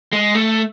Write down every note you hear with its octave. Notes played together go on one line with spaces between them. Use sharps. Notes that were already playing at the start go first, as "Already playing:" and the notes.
G#3
A3